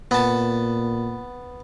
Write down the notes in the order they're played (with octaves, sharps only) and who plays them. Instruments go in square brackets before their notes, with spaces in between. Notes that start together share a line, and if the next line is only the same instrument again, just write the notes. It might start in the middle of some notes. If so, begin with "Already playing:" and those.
[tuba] A#2 [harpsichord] B3 A5